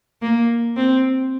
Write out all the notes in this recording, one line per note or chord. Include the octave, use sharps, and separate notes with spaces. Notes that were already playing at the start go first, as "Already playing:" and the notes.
A#3
C4